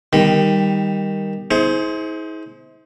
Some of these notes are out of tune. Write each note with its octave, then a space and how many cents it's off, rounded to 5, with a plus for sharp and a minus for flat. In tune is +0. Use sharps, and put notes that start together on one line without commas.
D#3 +0 G3 +10 B5 +45
E4 -45 G#4 +25 C5 +0